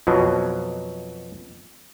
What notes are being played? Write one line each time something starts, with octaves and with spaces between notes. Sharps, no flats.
F2 B2 F#3